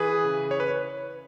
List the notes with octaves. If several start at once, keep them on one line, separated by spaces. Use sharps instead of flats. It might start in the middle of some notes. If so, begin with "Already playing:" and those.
Already playing: E3 G#4 B4
C#3
C#5
B4